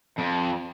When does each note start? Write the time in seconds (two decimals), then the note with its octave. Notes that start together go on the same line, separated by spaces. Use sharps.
0.18 F2